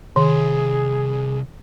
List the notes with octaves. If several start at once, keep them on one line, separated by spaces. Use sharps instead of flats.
C2 D#3 G#4